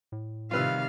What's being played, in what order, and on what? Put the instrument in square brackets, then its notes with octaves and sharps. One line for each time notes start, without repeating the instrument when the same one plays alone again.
[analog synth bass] A2
[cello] C3 D#3 [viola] G3 F5 [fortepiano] F4 B4 E6